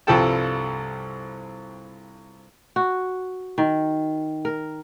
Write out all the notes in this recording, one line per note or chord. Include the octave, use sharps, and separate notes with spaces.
C2 G2 F3 A4 G5 A5
F#4
D#3
A#4